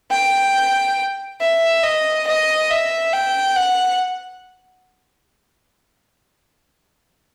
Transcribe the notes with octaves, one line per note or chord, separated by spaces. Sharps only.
G5
E5
D#5
D#5
E5
G5
F#5